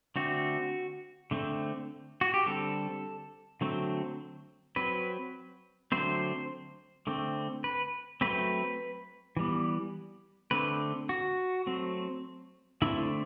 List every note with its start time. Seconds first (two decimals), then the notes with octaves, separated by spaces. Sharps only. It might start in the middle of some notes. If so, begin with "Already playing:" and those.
0.16 D3 A3 C4 F#4
1.31 D3 A3 C4
2.21 F#4
2.34 G4
2.46 D3 G3 C4 A4
3.61 D3 F#3 A3 C4
4.76 F#3 C4 B4
5.92 D3 F#3 A3 C4 C5
7.07 D3 A3 C4
7.64 B4
8.21 F#3 A3 C4 B4
9.37 E3 G3 B3
10.51 D3 A3 C4 B4
11.09 F#4
11.66 F#3 A3 C4
12.82 D3 A3 C4 E4